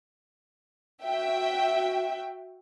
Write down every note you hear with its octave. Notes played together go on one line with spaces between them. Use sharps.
F#4 E5 G5